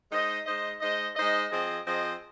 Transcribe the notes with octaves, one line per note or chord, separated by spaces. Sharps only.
G#3 D#4 C5 D#5
G#3 D#4 C5 D#5
G#3 D#4 C5 D#5
G#3 D#4 C5 D#5
F3 C4 G#4 D#5
F3 C4 G#4 D#5